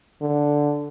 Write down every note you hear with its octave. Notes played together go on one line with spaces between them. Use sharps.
D3